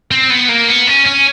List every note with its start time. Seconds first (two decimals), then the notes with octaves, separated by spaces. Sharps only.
0.11 C4
0.30 B3
0.49 A#3
0.68 B3
0.87 C#4
1.05 C#4